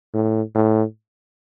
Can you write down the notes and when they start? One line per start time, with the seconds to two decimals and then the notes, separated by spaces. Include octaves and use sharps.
0.14 A2
0.55 A2